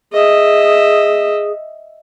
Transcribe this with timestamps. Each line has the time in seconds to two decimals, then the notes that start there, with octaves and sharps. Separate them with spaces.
0.13 G#4 D#5 E5